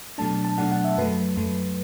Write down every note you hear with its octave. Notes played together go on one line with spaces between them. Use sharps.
B2 F#3 A3 D4 A5
A5
B2 F#3 A3 D4 F#5
F#5
E5
F#2 F#3 A3 B4
F#2 F#3 A3